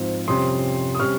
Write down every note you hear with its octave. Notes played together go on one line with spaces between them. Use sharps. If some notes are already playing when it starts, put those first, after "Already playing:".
Already playing: G#2 F3 C4
F2 C3 G3 C#4 C6 D#6
D#6
C3 G3 C#4 C#6 F6